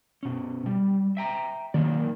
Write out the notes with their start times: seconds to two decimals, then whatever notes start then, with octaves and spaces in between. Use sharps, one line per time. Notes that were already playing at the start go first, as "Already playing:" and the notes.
0.23 B2 C#4
0.66 G3
1.17 E5 G5 A#5
1.74 D#3 F#3 A#3 D5